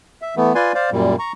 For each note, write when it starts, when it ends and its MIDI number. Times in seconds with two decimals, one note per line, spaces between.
0.22 0.35 76
0.37 0.53 52
0.37 0.53 57
0.37 0.53 59
0.55 0.72 65
0.55 0.72 71
0.55 0.72 74
0.55 0.72 80
0.55 0.72 84
0.75 0.90 72
0.75 0.90 74
0.75 0.90 77
0.92 1.16 42
0.92 1.16 46
0.92 1.16 55
1.19 1.32 82
1.19 1.32 85